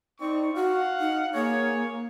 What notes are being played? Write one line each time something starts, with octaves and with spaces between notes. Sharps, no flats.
C4 D#4 D5 C#6
F#4 F5 F#5
D#4
A#3 G#4 C#5